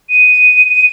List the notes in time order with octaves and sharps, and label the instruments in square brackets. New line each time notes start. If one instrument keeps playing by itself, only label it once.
[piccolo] D#7